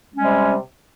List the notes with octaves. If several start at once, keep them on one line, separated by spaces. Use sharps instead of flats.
C3 G3 G#3 C#4